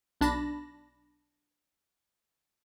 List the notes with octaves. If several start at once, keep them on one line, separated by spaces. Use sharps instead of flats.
B1 D4 A5 B5 A#6